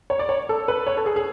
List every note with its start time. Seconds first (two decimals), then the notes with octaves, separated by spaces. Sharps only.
0.10 C#5
0.19 D5
0.29 C#5
0.49 A4
0.68 B4
0.87 C#5
0.97 A4
1.06 G#4
1.16 G#4